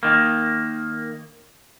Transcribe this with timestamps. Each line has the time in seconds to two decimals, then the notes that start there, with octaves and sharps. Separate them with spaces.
0.03 D#3 A#3